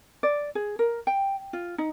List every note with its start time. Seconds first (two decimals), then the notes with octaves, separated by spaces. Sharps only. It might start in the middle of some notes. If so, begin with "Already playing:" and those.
0.23 D5
0.55 G#4
0.79 A#4
1.07 G5
1.53 F4
1.78 D#4